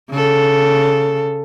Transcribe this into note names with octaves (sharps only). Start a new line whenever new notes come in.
C#3 A4